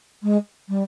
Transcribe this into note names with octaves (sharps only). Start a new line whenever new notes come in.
G#3
G3